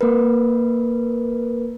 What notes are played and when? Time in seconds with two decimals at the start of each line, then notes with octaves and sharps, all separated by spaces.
0.01 A#3 A#4 B4